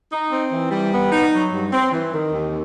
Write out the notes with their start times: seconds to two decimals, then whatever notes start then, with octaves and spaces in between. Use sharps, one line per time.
0.11 D#4
0.31 C4
0.52 E3
0.71 G3
0.92 B3
1.12 D#4
1.32 F#3
1.52 G2
1.72 C4
1.92 E3
2.13 D#3
2.33 D#2